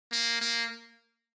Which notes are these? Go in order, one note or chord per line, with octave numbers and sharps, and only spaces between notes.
A#3
A#3